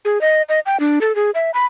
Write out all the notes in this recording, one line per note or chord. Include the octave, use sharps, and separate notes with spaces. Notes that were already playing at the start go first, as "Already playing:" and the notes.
G#4
D#5
D#5
G5
D4
A4
G#4
E5
B5